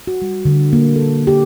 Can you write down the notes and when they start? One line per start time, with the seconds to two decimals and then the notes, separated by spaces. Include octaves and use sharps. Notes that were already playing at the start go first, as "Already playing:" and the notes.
0.07 F#4
0.22 G3
0.45 D3
0.73 A#3
0.96 A4
1.27 G4